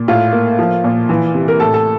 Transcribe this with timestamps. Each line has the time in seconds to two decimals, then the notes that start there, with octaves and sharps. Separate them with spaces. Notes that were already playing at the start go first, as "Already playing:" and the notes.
Already playing: A#2
0.08 A2 F4
0.33 A#3
0.59 F3
0.84 A#2
1.09 E3
1.34 C3
1.48 A#4
1.60 A2 A4
1.74 A4